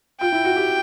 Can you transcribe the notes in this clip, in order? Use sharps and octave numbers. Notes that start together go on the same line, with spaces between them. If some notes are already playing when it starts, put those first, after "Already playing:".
F4 G5
E4
F#4
G4